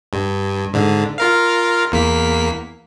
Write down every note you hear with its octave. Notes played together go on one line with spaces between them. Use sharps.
G2
G#2 D3
F4 A#4 F5
E2 A#3 B6